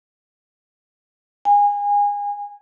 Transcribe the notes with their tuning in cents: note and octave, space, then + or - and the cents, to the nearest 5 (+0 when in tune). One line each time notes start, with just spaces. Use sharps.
G#5 -25